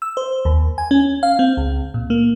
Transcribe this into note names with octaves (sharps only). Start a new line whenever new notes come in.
E6
C5
D#2
G#5
C#4
F5
C4
C#2
A#2
A#3